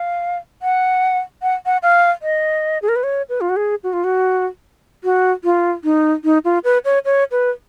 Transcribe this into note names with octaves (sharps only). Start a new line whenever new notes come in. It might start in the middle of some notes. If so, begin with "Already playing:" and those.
Already playing: F5
F#5
F#5
F#5
F5
D#5
G#4
A#4
B4
C#5
B4
F4
F#4
G#4
F#4
F4
F#4
F#4
F4
D#4
D#4
F4
B4
C#5
C#5
B4